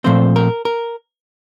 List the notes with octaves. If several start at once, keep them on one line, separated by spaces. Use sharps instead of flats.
A#2 F3 A3 C4 C5
A#4
A#4